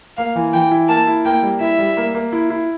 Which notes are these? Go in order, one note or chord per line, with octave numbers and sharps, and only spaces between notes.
A#3 F5
E3
E3 G5
E4
A#3 A5
E4
A#3 G5
G3
E4 E5
G3
A#3
A#3
E4
E4